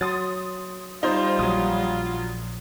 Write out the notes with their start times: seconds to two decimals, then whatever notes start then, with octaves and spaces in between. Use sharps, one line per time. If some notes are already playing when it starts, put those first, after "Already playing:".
0.01 F#3 C6 D#6 A6
1.03 G3 D#4 F4 C5
1.39 A#1 F#3 D#6